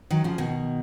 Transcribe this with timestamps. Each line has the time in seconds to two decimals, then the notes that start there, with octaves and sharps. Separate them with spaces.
0.10 D#3 F#3
0.24 C#3 F3
0.38 B2 D#3